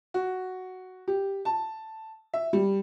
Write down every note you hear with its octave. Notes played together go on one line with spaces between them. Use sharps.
F#4
G4
A5
E5
G3